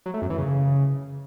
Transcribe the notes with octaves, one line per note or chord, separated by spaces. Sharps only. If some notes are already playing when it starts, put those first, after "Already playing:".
F#3
A3
F#2
E3
C#3